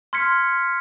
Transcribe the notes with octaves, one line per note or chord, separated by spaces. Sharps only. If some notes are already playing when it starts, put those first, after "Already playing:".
C6 F6 G#6 B6 C#7